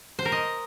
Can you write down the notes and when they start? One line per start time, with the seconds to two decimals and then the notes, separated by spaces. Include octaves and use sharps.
0.19 C5
0.25 A#4
0.32 D#5